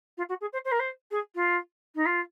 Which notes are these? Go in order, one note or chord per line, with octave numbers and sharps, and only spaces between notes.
F4
F#4
G#4
C5
C5
A#4
C5
G#4
F4
D#4
F4